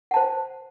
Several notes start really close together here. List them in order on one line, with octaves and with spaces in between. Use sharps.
F#5 A5 C5